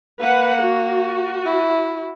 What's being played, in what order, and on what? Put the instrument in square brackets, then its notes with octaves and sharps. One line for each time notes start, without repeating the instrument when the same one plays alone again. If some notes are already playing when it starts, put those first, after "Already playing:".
[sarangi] A#3 [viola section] B4 F#5
[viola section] F#4
[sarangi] E4